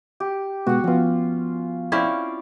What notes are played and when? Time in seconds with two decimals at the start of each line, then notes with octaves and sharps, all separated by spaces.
0.20 G4
0.67 B2 G#3 B3 F#4 F#5
0.84 F3 B3 C#4 F4
1.92 C4 C#4 E4 D5 F5